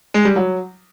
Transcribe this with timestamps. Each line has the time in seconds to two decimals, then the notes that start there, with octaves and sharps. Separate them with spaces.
0.14 G#3
0.25 G3
0.36 F#3